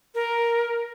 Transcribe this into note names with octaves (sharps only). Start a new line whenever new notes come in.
A#4